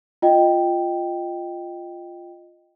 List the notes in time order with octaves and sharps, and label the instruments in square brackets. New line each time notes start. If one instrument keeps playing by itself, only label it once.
[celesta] F4 D#5 G5